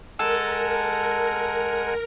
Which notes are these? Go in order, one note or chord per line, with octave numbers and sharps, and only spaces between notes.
G#3 A4 A#4 F#5 G#5